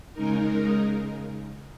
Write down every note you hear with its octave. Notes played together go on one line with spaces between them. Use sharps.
C#3 G#3 D#4 A#4